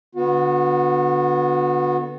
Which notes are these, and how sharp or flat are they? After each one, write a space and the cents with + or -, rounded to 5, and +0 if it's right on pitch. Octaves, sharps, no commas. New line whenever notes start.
D3 +0 B3 +0 F#4 -35